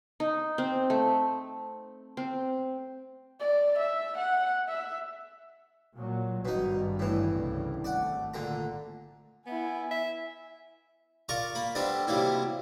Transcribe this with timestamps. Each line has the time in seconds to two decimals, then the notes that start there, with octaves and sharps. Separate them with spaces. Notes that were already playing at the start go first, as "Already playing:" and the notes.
0.20 D#4
0.58 C4
0.90 A3
2.17 C4
3.40 D5
3.78 E5
4.17 F#5
4.68 E5
5.97 A#2 F#3
6.45 G#1 G2 B2 D#4
6.99 A2 E3
7.33 C2 G2 C#3
7.84 G#1 A3 D5 F#5
8.34 A#2 D3 A#5
9.46 B3 E4 G#5
9.91 E5
11.29 F4 A#4 D5 A#5 C#6 D6
11.55 A#3 B5
11.75 G3 B3 C4 D4 A4 D5
12.07 D#2 C3 F#3 G3 A#3 E4